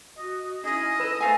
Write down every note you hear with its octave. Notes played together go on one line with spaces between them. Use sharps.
F#4 D#5
C#4 D#4 E4 G#4 D#5
A4 B4 E6
A3 C5 F5 G#5